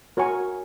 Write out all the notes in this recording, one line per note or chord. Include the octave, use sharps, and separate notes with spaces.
F#4 A#4 C#5 G#5 C#6